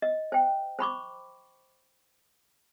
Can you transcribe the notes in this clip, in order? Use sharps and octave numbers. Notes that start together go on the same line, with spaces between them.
D#5
C5 G5
C5 B5 C#6 D6